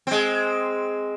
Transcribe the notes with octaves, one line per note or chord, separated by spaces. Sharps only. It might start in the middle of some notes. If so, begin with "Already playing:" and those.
G#3 C4